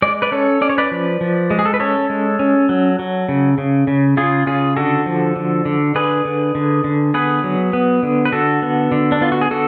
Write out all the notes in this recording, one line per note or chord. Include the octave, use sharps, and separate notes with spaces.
G#3 D5
B4 D5
C#4 A4 C#5
C#4 D5
C#5
B4 D5
F3
F3
G#3
G#4
A4
B4
C#4 A4 C#5
G#3
C#4
F#3
F#3
C#3
C#3
C#3
C#3 F4 G#4
C#3 F4 G#4
D3 F#4 A4
F3
D3
D3
D3 G#4 B4
D3
D3
D3
B3 G#4 B4
F#3
B3
D3
B4
D3 F#4 A4
B3
D3
D4
B3 F4
F#4
G#4
D3 F#4 A4